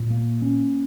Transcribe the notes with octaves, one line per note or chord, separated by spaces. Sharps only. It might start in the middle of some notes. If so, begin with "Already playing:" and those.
Already playing: A#2
A#3
C#4